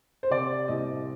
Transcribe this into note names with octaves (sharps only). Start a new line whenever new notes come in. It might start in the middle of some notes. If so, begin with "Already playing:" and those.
C5
C3 D5
C2 D#5